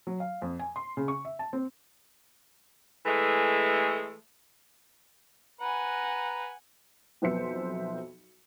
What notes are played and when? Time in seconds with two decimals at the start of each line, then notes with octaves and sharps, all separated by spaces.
0.07 F#3
0.20 F5
0.42 F2
0.59 G#5
0.76 C6
0.97 C#3
1.08 C#6
1.25 E5
1.39 A5
1.53 C4
3.05 E3 G#3 A3
5.61 B4 F#5 G#5 A#5
7.22 B1 F2 B3 C5 E5 C#7